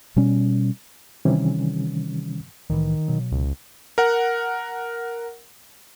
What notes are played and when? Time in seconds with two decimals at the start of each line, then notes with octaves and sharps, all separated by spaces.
0.16 B2 G3 C#4
1.25 C3 D#3 E3 G3 C#4
2.70 C2 A2 D#3 E3
3.08 B2 F#3
3.32 C#2
3.98 A#4 F#5